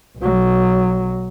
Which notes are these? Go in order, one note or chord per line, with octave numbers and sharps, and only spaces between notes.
B1 F#3